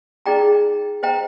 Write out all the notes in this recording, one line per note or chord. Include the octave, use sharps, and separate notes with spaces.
D#4 G#4 D5 G5 A#5
C5 D#5 G5 A#5